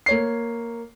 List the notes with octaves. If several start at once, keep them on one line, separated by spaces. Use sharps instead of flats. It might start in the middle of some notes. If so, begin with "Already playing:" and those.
A#3 C#5 C7